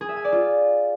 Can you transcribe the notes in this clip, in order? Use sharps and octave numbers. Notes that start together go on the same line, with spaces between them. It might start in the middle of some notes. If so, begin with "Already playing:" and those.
G#4
E5
G#5
D5
F4